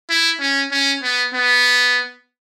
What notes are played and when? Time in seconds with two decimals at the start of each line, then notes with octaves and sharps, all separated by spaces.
0.10 E4
0.40 C#4
0.72 C#4
1.03 B3
1.34 B3